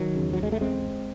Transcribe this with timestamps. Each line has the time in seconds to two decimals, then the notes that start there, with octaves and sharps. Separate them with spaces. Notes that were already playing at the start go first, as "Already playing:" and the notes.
Already playing: D#3 F#3
0.16 E2 C#3
0.33 F#3
0.43 G#3
0.52 A3
0.61 G#3 C4